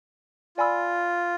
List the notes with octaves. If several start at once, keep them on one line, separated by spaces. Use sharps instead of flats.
F4 D5 G#5 B5 E6